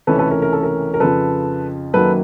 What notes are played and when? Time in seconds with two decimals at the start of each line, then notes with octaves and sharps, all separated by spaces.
0.07 C#2 C3 E3 A3 C#4 A4 B4
0.19 A4 B4
0.31 A#4
0.42 A#4
0.53 A4
0.63 A#4
0.94 A#4
1.00 F2 C#3 F3 A4 B4
1.93 F#2 D#3 F#3 A#3 A4 B4